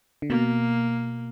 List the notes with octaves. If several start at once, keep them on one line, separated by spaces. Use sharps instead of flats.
D3
B2 A#3